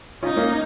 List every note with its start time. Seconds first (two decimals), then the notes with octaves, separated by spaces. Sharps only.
0.23 C#4 D#4 F4
0.36 A#3 C#4